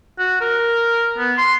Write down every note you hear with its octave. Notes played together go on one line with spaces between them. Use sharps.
F#4
A#4
B3
C6